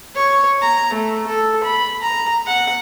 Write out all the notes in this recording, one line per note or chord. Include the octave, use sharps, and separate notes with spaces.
C#5
A#5
A3
A4
B5
A#5
F#5